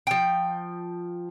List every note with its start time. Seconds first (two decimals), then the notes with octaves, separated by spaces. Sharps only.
0.07 F3 G5